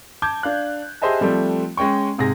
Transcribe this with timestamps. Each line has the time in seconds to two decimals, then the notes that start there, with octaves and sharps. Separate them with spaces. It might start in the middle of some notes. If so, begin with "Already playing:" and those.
0.22 A5 D6 G6 G#6
0.43 D4 F5 F#6
1.02 G4 G#4 C5 D#5 E5 A5
1.21 F3 G3 A3 C4
1.77 G#3 C#4 G5 C#6
2.18 G#2 C3 G#4 G#5 A#6